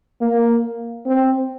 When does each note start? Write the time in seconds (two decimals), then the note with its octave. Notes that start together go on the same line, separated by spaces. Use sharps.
0.21 A#3
1.06 C4